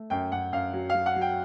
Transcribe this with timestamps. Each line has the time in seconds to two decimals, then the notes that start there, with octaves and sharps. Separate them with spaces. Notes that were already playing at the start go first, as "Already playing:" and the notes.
Already playing: A3
0.10 F#2 G5
0.32 F#2 F#5
0.52 F#2 F5
0.73 F#3
0.90 F5
0.95 F#3
1.06 F#5
1.16 F#3
1.21 G5